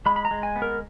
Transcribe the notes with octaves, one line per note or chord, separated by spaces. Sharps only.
G#3 B5
B5
A#5
G#3
G#5
B3
A#4